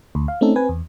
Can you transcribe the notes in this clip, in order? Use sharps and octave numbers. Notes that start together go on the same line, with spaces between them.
D2
F5
A3 C4 C#4 D#4 A4
C4 B4 G#5
E2